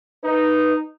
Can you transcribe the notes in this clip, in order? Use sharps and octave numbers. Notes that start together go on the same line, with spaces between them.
D#4 B4